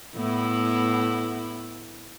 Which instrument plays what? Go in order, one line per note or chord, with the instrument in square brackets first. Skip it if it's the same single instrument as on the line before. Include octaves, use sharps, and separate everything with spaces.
[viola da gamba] A2 B3 E4